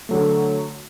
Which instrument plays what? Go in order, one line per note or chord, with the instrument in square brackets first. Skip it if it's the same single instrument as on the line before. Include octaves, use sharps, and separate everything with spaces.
[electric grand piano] D3 F#3 A3